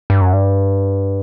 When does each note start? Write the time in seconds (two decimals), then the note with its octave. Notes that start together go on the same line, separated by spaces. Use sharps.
0.10 G2
0.21 F#2
0.33 G2